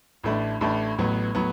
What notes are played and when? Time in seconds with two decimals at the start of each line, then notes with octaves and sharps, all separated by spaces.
0.24 A1 A2 A3 D4
0.61 A1 A2 A3 D4
0.98 A1 A2 F#3 B3
1.35 A2 F#3 B3